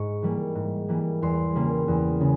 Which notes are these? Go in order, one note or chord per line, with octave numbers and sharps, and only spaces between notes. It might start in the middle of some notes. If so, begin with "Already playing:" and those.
Already playing: G#2 C#6
E3 G3 A#3
G#2
E3 G3 A#3
E2 C6
C#3 G3 A#3
E2
C#3